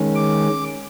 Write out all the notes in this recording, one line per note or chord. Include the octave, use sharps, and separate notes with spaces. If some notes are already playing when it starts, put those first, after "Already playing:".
Already playing: D#3 G#3 C#4
D6